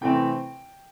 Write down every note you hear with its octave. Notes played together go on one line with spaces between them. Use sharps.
C3 E3 A3 C4 G5